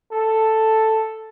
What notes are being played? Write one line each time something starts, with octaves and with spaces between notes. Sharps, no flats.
A4